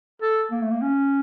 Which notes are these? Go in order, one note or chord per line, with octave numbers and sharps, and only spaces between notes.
A4
A#3
A3
A#3
C#4